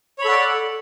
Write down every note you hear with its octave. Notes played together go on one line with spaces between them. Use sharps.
A4 C#5 D5 F#5 B5